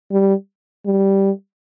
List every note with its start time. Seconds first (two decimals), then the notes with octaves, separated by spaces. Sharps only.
0.12 G3
0.86 G3